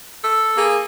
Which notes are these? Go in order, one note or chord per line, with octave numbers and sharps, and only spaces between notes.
A4
A#3 G#4